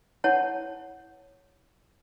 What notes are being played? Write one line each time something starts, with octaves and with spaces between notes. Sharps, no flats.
E4 C#5 F#5 A5